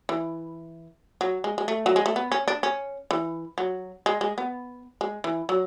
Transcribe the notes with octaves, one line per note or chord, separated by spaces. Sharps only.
E3
F#3
G#3
G#3
A3
F#3
G#3
A3
B3
C#4
D4
C#4
E3
F#3
G#3
G#3
B3
G#3
E3
F#3